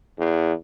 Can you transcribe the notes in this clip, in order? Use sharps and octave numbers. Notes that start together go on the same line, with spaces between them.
E2